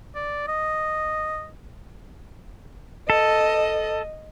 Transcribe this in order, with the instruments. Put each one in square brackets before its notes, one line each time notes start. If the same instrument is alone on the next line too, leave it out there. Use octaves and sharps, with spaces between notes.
[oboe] D5
D#5
[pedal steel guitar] A4 [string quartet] D#5